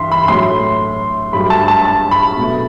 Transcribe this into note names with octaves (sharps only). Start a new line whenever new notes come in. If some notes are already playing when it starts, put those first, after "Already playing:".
Already playing: G2 E3 E5 C6
B5
A2 F#3 A3 C6
G2 F#3 A3 B5
A5
A5
A5
B5
B2 A3